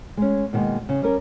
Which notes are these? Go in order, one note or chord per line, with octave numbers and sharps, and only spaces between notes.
G#3 C#4
B2 D#3 G3 G#3 A#3
C#3
G3 C#4 A#4